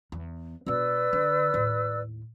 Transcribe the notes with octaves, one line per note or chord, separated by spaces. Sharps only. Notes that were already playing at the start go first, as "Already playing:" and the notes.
E2
B2 D4 B4 D5 E6
D3
D#2 A2